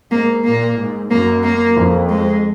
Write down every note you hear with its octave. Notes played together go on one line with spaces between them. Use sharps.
G#2 A#3
A#2 A#3
G#2
F#2 A#3
A#3
F2
G#3